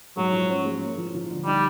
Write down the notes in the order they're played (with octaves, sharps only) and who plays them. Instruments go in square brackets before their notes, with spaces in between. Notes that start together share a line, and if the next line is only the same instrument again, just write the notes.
[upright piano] G#2 [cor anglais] F#3
[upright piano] F3
C#4
G#3
A#3
F3
F3
D3
[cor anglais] G3 [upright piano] D#4